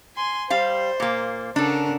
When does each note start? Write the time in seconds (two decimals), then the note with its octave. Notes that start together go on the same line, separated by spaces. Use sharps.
0.16 G#5 C6
0.50 G3 C5 F5
1.00 A#2 A#3
1.56 C#3 D4 A4 A#4 F#5